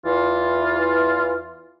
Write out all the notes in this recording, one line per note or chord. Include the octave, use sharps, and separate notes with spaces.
E2 E3 F4